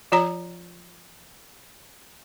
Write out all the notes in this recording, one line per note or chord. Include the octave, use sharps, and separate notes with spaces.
F3 F4 C#5 A#5